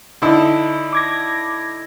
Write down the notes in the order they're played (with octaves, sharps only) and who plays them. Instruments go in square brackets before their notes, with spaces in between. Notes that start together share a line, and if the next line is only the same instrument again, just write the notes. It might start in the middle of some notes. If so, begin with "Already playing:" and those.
[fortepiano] D3 D#4 E4
[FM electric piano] D6 G#6 A#6